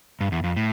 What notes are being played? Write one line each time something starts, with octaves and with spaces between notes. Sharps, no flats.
G2
E2
F2
A2